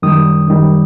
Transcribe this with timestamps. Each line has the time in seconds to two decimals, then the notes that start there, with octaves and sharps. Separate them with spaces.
0.02 F#2 D#3 G3 D#6
0.48 F#2 D#3 G3